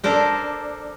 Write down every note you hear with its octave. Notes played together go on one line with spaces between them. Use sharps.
D4 A4 A#4 C5